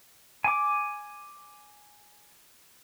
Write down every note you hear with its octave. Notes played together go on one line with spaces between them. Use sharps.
G#5 D6